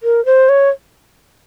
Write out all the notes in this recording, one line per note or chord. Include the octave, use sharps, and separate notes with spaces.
A#4
C5
C#5